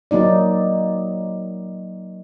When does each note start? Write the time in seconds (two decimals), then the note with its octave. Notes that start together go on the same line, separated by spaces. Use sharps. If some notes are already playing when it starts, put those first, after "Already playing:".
0.11 F#3 A#3 D#4 D5